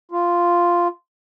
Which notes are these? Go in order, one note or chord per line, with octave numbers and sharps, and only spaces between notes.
F4